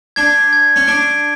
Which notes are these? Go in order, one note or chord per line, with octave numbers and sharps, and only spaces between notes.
D4 G#6
G#6
C#4
D4 D7